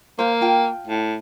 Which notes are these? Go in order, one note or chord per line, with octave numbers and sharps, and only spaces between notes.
A#3 C5 F5
F4 G5 A5
A2